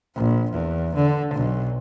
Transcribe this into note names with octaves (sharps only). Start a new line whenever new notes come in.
A#1
E2
D3
B1